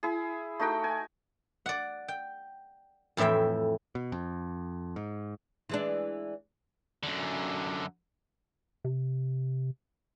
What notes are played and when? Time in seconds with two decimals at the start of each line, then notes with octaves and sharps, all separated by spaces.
0.03 E4 G#4
0.60 A3 D#4 F#4 G5
0.84 G#5
1.66 D5 F#5
2.08 G5
3.17 F2 A2 E3 E5 G5
3.95 B2
4.12 F2
4.96 G#2
5.69 E3 G#3 D4
7.03 F#2 D3
8.84 C3